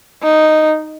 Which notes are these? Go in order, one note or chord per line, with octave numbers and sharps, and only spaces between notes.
D#4